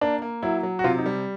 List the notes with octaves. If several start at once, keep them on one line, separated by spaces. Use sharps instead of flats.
A#3 D4
A#3
F#3 E4
F#3
F#4
C3 F4
D#4
G3